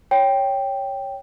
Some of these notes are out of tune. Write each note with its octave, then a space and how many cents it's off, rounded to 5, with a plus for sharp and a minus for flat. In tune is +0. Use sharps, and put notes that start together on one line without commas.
C#5 +0 G5 +0